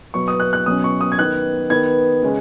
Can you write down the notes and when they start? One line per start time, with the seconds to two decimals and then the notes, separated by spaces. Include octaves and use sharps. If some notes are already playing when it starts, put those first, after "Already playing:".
0.14 B2 F#3 B3 C#6
0.28 D#6
0.40 F#6
0.53 F#6
0.66 B2 F#3 C#4 D#6
0.84 C#6
1.01 D#6
1.12 G#6
1.19 D#3 B3 F#6
1.70 D#3 B3 G#6
2.23 C#3 G#3 C#4